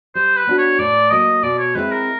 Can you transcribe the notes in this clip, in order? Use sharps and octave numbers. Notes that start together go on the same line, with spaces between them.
G3 C5
B4
B3 D4 F#4
C#5
A2 D5
F#3 A#3 D#5
B2 D5
C#5
G#3 C4 E4 B4
A#4